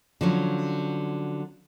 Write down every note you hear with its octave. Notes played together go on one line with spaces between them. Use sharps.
D3 F3 F#3 C#4